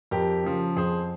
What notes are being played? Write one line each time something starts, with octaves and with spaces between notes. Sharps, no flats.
F2 G4 A#4
C#3 F3
F2 G#4 C5